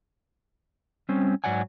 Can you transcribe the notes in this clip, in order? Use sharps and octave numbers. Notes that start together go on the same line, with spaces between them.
G3 C4 C#4
G#2 F#3 D5 F#5 G#5